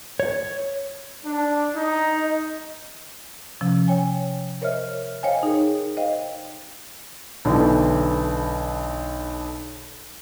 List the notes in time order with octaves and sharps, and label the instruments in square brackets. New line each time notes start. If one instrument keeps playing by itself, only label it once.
[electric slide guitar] C#5
[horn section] D4
D#4
[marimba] C3 F3 C#4
C#5 G5 G#5
A#4 C5 C#5 D#5 E5 F6
C5 C#5 D#5 F5 G5 G#5
D#4 G#4 A#4
C5 D#5 F5 G5
[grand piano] B1 D3 E3